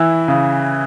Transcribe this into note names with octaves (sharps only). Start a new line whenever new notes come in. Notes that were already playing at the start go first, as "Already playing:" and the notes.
Already playing: E3 E4 E6
C#3